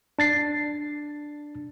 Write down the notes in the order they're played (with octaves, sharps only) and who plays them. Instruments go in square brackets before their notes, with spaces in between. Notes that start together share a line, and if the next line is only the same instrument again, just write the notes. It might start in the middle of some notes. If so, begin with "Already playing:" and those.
[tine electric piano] D4 A6 C7